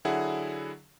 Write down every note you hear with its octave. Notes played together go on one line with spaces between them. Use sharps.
D3 F#3 E4 G#4 F#5